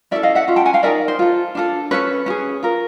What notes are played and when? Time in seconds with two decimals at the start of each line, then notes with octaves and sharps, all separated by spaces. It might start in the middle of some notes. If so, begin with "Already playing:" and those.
0.11 C#4 E4 A4 D5 E5
0.23 D#5 F5
0.35 E5 F#5
0.48 C#4 F4
0.56 G5 A5
0.65 F#5 G#5
0.74 F5 G5
0.83 D#4 F#4 A#4 D5 E5
1.08 C5
1.19 F4 A4
1.55 D4 F4 A4
1.91 C#4 E4 A4 B4 C#5
2.26 C#4 E4
2.30 G#4
2.63 F4 A#4